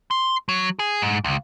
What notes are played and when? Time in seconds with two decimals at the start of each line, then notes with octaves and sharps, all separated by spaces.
0.11 C6
0.49 F#3
0.79 G#4
1.02 G#2
1.24 C#2